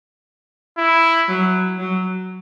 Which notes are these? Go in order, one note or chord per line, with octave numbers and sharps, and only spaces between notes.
E4
F#3
F#3